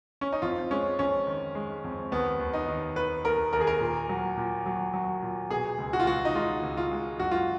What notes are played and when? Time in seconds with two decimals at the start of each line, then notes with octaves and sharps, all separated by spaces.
0.21 C#4
0.32 D#4
0.42 F2 F4
0.71 G#3 C#4
0.99 F2 C#4
1.27 D#3
1.55 G#3
1.84 F2
2.12 D#2 B3
2.40 D#2
2.53 D#4
2.68 D#2
2.96 D#3 B4
3.25 D#2 A#4
3.53 D#2 A#4
3.61 G#4
3.67 A#4
3.81 A#2
4.09 F#3
4.37 A#2
4.66 F#3
4.94 F#3
5.22 A#2
5.50 B2 G#4
5.78 C#2
5.93 F#4
6.00 F4
6.07 C#2 F#4
6.25 D#4
6.35 G#3 F4
6.63 C#2
6.77 F4
6.91 G#3
7.19 F#2 F#4
7.31 F4